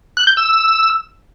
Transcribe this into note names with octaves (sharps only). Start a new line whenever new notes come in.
F#6
G6
E6